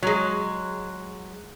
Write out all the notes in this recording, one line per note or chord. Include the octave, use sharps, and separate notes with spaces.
F#3 G#3